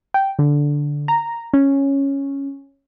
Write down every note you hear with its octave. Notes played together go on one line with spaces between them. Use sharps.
G5
D3
A#5
C#4